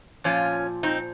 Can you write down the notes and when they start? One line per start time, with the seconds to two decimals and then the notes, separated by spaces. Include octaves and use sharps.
0.24 A#2 F3 C#4 F4
0.83 C4 D#4